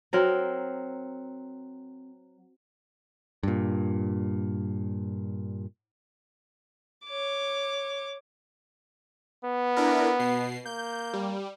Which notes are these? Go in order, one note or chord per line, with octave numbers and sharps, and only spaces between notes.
F#3 C4 A#4
G2 A#2
C#5 D6
B3
D4 E4 A#4
B2 C7
A#3 G6
G3